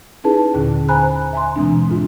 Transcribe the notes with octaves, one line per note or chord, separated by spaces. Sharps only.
C#4 D#4 E4 G#4 B4 A5
D#2 A#2 D3 C#4
C5 G#5 A#5 B5 F#6
E5 G#5 A#5 C6
B2 E3 G#3 C4 D4
G#2 F4